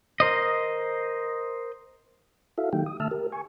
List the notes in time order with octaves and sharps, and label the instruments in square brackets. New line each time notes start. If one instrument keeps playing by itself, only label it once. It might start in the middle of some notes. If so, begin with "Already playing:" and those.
[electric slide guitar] A#4 C5 D#5
[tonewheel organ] E4 F#4 A4 E5 F5
D#3 F#3 A#3 D#4 G4 G5
D#6
D3 A3 E5 A5 E6 F6
G4 A#4
G#5 C#6